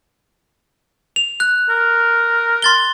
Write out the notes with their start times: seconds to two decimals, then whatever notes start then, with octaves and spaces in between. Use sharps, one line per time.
1.16 F7
1.40 F#6
1.70 A#4
2.62 C6 A6 G7